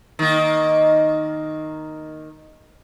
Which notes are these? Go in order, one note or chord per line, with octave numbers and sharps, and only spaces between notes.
D#3 A#3